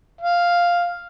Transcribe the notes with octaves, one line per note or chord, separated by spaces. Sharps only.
F5